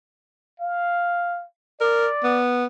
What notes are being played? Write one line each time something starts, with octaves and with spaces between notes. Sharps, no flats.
F5
A#4 D5
B3